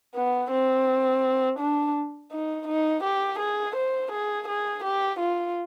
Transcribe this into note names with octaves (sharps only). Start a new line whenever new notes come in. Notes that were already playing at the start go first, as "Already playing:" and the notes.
B3
C4
D4
D#4
D#4
G4
G#4
C5
G#4
G#4
G4
F4